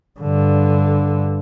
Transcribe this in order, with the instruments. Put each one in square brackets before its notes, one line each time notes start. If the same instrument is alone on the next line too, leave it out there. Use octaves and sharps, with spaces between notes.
[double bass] G2 D3